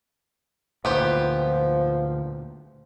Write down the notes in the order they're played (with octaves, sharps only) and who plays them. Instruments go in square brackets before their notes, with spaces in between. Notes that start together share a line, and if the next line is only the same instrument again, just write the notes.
[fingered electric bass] D2 A#2 [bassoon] F3 [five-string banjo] B3 G4 C5